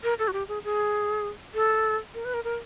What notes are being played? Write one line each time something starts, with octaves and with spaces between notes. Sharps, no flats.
A#4
A4
F#4
G4
G#4
G#4
A4
A#4
B4
A#4
A#4